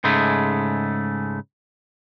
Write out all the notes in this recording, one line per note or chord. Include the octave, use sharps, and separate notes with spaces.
G#2 C#3 G#3 A3